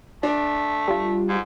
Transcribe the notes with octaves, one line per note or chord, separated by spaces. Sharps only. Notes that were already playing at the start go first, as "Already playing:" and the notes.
A3 D4
G3 F4
G#2